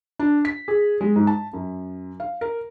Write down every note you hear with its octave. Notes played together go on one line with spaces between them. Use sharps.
D4
B6
G#4
G#3
G#2
A5
F#2
F5
A#4